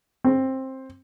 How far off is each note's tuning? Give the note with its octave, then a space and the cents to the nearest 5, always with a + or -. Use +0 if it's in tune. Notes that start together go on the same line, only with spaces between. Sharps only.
C4 +15